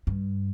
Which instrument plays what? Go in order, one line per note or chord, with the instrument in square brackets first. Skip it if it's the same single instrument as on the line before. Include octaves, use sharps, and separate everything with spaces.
[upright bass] G2